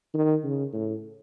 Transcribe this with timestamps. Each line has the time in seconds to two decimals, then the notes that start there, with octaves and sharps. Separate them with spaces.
0.14 D#3
0.44 C#3
0.73 A2